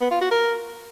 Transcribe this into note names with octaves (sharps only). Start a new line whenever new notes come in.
B3
F4
F#4
A#4